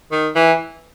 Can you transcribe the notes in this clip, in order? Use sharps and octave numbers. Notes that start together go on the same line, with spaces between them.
D#3
E3